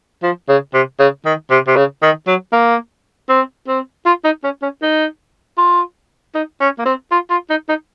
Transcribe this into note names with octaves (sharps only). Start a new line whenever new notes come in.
F3
C#3
C3
C#3
D#3
C3
C3
C#3
D#3
F#3
A#3
C4
C4
F4
D#4
C#4
C#4
D#4
F4
D#4
C#4
A#3
C4
F4
F4
D#4
D#4